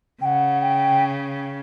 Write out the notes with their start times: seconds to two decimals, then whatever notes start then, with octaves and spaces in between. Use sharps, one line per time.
0.21 C#3 F#5 G5
0.62 G5